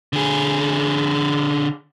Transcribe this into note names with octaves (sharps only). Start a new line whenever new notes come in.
D3 G#4